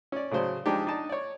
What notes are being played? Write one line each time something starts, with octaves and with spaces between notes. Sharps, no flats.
C#4 D5
A2 C#3 F#3 C5 D5
F3 G#3 D4 D#4 G4
D4 D#4 D#5 A5
C#5 D5